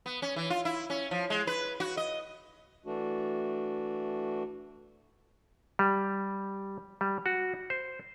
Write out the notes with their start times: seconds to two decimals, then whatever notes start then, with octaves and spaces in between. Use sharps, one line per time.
0.06 B3
0.22 C#4
0.36 E3
0.50 F4
0.65 E4
0.90 C#4
1.11 F3
1.30 G#3
1.47 B4
1.80 F#4
1.97 D#5
2.86 E3 A3 D4 F#4
5.79 G3
7.01 G3
7.26 F#4
7.70 C5